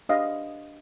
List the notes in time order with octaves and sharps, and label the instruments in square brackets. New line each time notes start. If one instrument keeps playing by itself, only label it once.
[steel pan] D4 G4 B4 D#5 F5